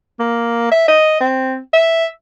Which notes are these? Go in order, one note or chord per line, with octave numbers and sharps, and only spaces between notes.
A#3
E5
D#5
C4
E5